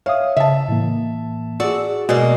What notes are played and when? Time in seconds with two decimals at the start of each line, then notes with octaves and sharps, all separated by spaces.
0.06 C#5 E5 F5 D#6
0.37 C#3 E5 A5
0.68 A2 E3 A#3
1.60 F#4 G#4 D5 E6
2.09 B2 G#3 A#3 D5